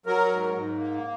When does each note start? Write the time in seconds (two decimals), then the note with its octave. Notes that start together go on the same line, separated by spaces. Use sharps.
0.06 F#3 A#4
0.30 G#2
0.54 G#2
0.77 A#3